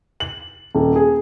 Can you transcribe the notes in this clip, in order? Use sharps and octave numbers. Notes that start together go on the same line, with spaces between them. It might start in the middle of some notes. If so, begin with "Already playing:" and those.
F#7
D#1
G#4